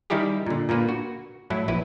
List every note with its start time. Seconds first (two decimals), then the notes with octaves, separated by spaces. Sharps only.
0.10 D#3 G3 D#4 E4 G4 G#4
0.46 A#2 D3
0.69 A#2 D3 A#3 B4
0.89 F#4
1.50 A2 F#3 E4
1.68 A#1 E4 B4